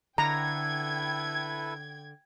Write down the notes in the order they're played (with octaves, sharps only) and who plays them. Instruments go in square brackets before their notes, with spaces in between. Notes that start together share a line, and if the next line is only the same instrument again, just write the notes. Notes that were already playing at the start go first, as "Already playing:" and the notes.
[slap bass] D3 [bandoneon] E4 A4 B4 [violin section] G5 G#6 [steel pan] A#5